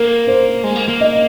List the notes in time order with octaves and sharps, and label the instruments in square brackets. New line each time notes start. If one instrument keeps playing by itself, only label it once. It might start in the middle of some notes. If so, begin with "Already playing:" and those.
Already playing: [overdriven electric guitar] A#3 [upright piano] A#4
[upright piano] C5
[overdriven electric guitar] G#3
A#3
A#3
[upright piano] D#5